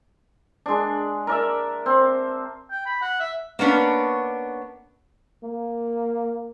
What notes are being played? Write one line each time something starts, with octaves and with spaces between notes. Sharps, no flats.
G#3 D4
A#4 D5 E5
C4
G5
B5
F#5
E5
A#3 B3 C#4 D4 B4
A#3